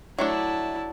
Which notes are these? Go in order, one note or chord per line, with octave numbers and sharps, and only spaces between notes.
F#3 A3 D4 E4 A5